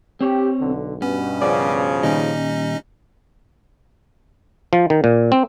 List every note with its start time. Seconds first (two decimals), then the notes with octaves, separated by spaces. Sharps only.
0.21 C4 G4 C#5
0.60 B1 D3
1.02 G2 B2 B3 C#4
1.41 C#3 F3 D5
2.03 A#2 D#3 G3 C#4 D#4 D#5
4.73 F3
4.90 D#3
5.04 A#2
5.32 C4